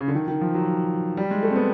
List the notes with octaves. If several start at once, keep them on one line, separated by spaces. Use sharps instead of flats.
C#3
D3
D#3
D#3
F3
F#3
G3
G#3
A3
C4
B3